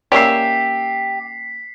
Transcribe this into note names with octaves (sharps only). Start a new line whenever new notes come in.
A#3 C#4 G4 D5 E5 B6 C7